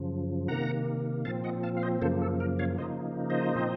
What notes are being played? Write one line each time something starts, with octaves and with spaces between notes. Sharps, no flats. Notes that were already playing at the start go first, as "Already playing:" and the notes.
Already playing: F#2 C#3 F3
C3 D#3 A#3 F#5 A#5
A#2 F3 C4 F5 A5
D#5 F#5
F5 A5
F5
C5 D#5
F#2 C#3 F3 A#3 A4 C5
A4
A#4
C#5 F5
C#3 F3 A#3 D#4 C5 D#5
C5 D#5
A#2 F3 C4 D#4